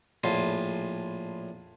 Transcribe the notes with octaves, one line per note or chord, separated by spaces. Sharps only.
A#1 A2 F4